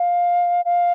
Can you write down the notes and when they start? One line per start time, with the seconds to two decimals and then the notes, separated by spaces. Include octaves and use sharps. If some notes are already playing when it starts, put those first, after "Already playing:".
Already playing: F5
0.65 F5